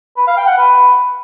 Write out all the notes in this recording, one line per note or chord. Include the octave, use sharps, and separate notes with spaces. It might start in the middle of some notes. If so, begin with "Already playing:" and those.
B4
F5
G5
F#5
B4